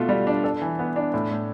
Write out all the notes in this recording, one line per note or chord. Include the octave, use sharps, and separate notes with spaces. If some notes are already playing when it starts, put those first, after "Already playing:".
Already playing: B2 A3 F4
G3
D4
A4
E3
B3
D4
A2
A2